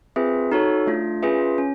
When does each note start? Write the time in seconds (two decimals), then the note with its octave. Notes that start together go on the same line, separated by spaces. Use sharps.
0.16 C4 F4 G#4 B4 E5
0.52 D#4 F#4 A4 C#5
0.87 A3 D4 F4
1.22 C#4 F4 G#4 B4 E5
1.58 C#4